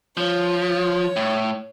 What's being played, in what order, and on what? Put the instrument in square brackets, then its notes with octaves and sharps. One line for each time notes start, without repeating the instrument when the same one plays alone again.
[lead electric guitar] F3 [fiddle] C#5
[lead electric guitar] A2